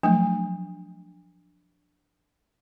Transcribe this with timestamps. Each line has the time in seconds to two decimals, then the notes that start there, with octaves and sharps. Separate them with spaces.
0.03 F3 F#3 A3 D4